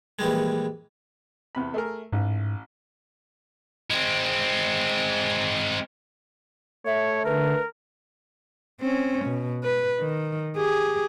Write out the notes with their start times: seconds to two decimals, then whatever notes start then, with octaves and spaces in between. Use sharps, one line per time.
0.19 A#1 E3 G3 G#3
1.55 E2 C3 B5
1.74 A3 G#4 A#4
2.12 A1 G#2
3.91 G#3 C4
6.86 A3 C#5 E5
7.25 D3 A#4 B4
8.81 C4 C#4
9.26 B2
9.64 B4
10.00 D#3
10.57 G4 G#4